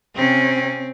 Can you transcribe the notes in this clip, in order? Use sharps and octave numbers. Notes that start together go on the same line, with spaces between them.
C3 C4 C#4